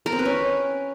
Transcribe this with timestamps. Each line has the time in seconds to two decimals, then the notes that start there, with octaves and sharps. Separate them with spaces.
0.06 A#4
0.12 C4
0.19 B4
0.25 C#4